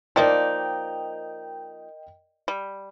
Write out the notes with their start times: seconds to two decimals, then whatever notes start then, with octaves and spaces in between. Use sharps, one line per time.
0.16 F3 A#3 D#4 A#4 D5 D#5 G5
2.48 G3